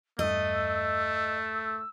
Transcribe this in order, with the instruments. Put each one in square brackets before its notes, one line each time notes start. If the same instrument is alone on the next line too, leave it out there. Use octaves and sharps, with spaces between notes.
[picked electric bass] E2 G2 G3 [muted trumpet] A3 [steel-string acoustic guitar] D#5 [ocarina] E6